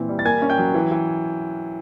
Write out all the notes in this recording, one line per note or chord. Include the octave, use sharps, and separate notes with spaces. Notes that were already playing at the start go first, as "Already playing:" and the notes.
Already playing: A#2 E3 C4
G3
A6
A#3 G#5 G#6
C#4
G5 G6
F#3
E3
E3